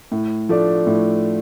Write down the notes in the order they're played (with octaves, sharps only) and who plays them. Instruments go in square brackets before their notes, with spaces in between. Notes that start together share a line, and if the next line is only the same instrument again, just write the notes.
[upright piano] A2
F3 A3 D4
A2